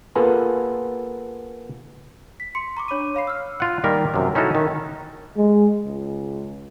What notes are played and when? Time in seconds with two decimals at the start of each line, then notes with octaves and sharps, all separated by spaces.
0.15 A#3 B3 F4 G#4 A4 B4
2.40 B6
2.55 C6 C#7
2.77 A#5 C#6 D6
2.88 D4 C#5 B5 D6 D#7
3.15 C#5 F5 B5 C7
3.27 E6 F6
3.60 F4 F#5
3.84 D#3 G3 A#3 A#4
4.14 F#2 C3
4.35 C#4 D#4 E4 F#4 A4
4.55 D#3
5.37 G#3
5.85 C#2